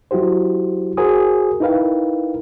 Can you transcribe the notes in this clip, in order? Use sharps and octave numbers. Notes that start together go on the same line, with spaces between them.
F#3 E4 F#4 G4 C5
F#4 G#4 A#4 C5 G#5 D#6
D#4 E4 A#4 B4 F5 G5